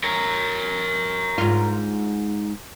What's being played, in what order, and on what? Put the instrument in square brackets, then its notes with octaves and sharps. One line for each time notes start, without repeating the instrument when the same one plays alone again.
[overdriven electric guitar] A#4 C#5
[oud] G#2 F4